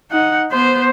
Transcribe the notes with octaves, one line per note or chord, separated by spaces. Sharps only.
D#4 F#5
B3 C5